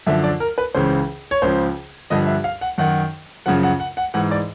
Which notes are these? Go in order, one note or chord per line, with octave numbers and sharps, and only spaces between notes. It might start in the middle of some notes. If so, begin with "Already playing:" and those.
F#2 D3 F3 E5
D5
A#4
B4
C#2 C#3 E3 C5
C#5
C#2 C#3 F3 C5
G2 D3 F3 D#5
E5
F5
F#5
F#2 D#3 F#5
F#2 C#3 F3 F#5
F#5
F#5
F#5
G#2 E3 F#5
D5